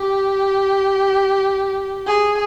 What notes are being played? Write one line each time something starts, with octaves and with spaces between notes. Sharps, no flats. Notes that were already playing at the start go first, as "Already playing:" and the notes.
Already playing: G4
G#4